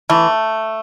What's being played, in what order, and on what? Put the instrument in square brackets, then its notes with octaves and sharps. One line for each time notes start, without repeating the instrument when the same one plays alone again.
[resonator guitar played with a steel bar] E3 [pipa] A3